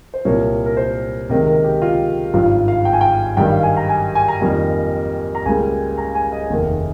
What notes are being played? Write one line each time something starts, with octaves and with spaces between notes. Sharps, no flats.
C5
C2 A#2 G3 A#3 C#5
A#4
C5
C#2 C3 D#3 A#3 A#4
A#4
G4
F4
G#1 G2 F3 F4
F5
G5
G#5
G5
G2 D#3 G3 G5
F5
G#5
A#5
G#5
G#5
A#5
F2 D#3 G3 A#3
A#5
C#2 C#3 G3 A#3 G#5
A#5
G#5
D#5
F1 D#2 D#3 A#3